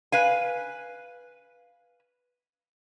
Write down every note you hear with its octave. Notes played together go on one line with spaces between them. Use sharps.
B4 F5 G#5